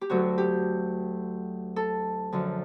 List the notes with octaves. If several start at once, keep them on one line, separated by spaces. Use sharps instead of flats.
G4
D2 D3 F#3 A3 F#4
G4
A4
F#2 D3 F3